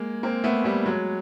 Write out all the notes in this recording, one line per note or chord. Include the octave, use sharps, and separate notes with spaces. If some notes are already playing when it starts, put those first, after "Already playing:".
Already playing: G#3 A#3
A#3 C4
A3 B3
G3 A3
F#3 G#3